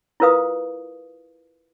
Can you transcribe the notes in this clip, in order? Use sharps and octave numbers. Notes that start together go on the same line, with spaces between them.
E4 F4 A#4 B4 F5 D#6